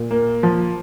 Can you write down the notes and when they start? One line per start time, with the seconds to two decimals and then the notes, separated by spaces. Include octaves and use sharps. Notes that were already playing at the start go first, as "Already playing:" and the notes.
Already playing: A#2
0.11 A#3
0.43 F3